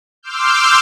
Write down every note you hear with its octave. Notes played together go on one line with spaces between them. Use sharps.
C6 D6 E6 F6 G6